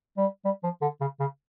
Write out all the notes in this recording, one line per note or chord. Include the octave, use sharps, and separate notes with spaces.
G3
G3
F3
D3
C#3
C#3